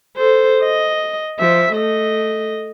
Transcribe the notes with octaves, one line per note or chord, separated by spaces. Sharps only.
A4 C5
D#5
F3 E5
A3 D#5